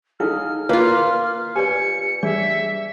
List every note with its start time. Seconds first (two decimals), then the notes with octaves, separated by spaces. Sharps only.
0.20 D#4 E4 G#4 A4 F5 F6
0.69 A#3 F4 B4
1.56 G4 B4 D5 G#5 C#7
2.23 G3 D4 G#4 D5 E5